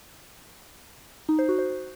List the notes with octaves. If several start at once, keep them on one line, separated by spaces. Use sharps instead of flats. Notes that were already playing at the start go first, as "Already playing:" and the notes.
D#4
C5
F#4
C5